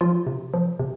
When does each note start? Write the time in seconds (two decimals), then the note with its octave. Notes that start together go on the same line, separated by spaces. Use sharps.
0.01 F3 F4
0.27 C3
0.54 F3
0.79 C3